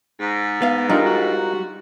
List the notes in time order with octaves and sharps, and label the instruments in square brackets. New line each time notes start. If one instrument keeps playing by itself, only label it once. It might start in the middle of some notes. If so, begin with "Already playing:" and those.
[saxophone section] G#2
[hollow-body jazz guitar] B3 F5
[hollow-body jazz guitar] G3 [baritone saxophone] D4 [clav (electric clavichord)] D#4 F4 A#4
[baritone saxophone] F#4